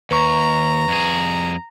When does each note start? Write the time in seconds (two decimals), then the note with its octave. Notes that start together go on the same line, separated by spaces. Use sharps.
0.11 D#2 B4 A#5 C#6
0.88 F2 G#4